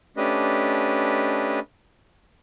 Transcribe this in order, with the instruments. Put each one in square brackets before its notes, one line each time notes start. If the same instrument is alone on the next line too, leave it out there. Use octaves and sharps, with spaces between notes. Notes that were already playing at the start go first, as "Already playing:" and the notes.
[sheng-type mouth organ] A3 C#4 D4 G4 B4 D#5